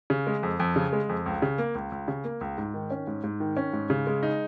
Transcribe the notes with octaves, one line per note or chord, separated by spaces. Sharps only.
C#3
G#3
F2
F2
C#3
G#3
F2
C#2
C#3
A#3
C#2
C#2
C#3
A#3
C#2
G#2
D#3
C#4
G#2
G#2
D#3
C#4
G#2
C#3
G#3
D#4